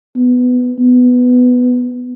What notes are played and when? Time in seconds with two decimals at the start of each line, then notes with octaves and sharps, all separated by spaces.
0.16 B3
0.78 B3